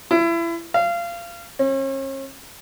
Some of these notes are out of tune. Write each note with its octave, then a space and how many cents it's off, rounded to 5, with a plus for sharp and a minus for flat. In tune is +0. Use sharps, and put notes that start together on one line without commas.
E4 +30
F5 -25
C#4 -40